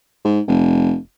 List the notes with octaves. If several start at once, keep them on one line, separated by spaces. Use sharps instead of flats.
G#2
F1